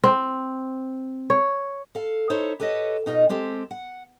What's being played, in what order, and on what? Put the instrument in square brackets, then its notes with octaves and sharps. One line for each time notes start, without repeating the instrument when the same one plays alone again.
[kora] C4
C#5
[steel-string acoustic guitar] A4 F5
D#4 E4 A4 C5 C#5
G4 A4 B4 C#5 D#5
B2 D#4 F4 B4 D#5
G#3 C4 G4 A4
F#5